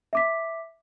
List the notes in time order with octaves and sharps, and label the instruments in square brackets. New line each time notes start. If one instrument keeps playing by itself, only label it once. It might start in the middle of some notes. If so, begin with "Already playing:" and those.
[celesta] E5 D6 B6